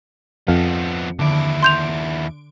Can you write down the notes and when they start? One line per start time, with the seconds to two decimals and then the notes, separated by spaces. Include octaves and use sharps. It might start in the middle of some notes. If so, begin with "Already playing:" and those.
0.48 F2 F3 B3 F5
1.19 D#2 D3 E4 D7
1.63 C6 G6 F7